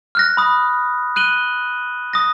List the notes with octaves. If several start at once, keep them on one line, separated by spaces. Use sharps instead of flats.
F6 F#6 A#6
B5 D#6
F#6 D#7 F#7 G7
D#6 A#6